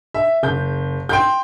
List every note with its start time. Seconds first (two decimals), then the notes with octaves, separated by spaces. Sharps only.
0.14 E5
0.43 F#1 G6
1.09 G5 C6 G6